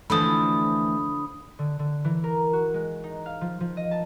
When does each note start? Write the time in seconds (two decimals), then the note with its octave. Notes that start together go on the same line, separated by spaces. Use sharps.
0.10 D3 E3 F3 A3 B5 D#6
1.59 D3
1.79 D3
2.05 E3
2.24 A#4
2.53 F#4
2.74 G#3
3.04 D#4
3.26 F5
3.41 F3
3.60 F3
3.77 D#5
3.91 A5